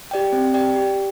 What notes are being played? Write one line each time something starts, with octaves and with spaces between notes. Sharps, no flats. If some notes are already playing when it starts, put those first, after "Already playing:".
G4 D5 G5
C4
G4 D5 G5
G4